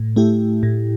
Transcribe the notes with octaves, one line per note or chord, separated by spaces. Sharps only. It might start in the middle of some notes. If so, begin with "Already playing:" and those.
Already playing: A2
A3 E4 G4
A2